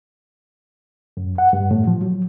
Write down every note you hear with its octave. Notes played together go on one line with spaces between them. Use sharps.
F#2
F#5
G2
A2
F3
F#3